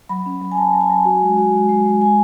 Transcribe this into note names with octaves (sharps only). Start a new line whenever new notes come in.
F#3 B5
C#4
F#3
G#5
F#3 A5
F#3
G#5
F#3
F#4
G#3
F#4
G#3
G#3
G#3
G#3 G#5